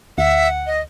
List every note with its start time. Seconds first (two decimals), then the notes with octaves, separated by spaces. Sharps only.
0.18 D2 E5 F#5
0.66 D#5